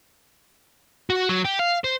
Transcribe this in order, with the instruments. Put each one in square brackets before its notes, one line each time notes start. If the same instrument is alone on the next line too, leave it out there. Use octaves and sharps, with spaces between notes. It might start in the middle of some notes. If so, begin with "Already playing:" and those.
[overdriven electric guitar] F#4
F#3
G4
F5
C5